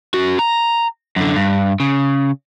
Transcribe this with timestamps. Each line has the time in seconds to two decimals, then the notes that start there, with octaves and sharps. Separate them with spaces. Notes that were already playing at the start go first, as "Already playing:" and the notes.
0.14 C#4 F#4
0.39 A#5
1.16 F#2 D3
1.36 G2
1.80 C#3